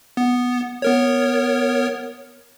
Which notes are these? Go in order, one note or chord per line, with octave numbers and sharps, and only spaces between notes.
B3
B3 A#4 C#5